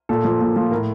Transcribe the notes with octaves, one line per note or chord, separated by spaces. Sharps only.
A#2 A4
F3
A#2
F3
A2 A#4